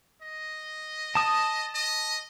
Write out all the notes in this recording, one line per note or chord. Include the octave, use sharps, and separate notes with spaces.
D#5
A5 D#6
D#5